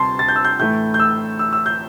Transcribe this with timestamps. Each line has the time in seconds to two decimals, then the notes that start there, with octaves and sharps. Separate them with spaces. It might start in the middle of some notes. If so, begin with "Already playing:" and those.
Already playing: D2 C3 G3 A5 C6
0.19 A6
0.28 G6
0.36 E6
0.45 G6
0.59 A2 E3 A3 G6
0.94 G6
1.00 E6
1.39 E6
1.53 E6
1.66 G6